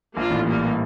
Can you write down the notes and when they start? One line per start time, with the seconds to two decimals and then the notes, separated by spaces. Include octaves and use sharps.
0.16 A#1 A#2 A#3 D4 F4
0.30 A1 A2
0.45 E3 G3 A#3